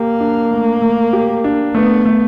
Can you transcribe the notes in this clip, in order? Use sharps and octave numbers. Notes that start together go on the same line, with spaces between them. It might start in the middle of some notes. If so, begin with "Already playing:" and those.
Already playing: A#3 G4
D4
A3
A3
G4
D4
A3 B3
A3